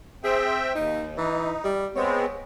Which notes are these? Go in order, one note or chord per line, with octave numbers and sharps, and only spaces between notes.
C4 G#4 E5 G5
D#2 D#4
E3 D#4
G3
G#3 B3 C4 C#5